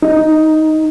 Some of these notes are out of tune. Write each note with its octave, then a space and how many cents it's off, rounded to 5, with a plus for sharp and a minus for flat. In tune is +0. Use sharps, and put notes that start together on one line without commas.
D#4 +5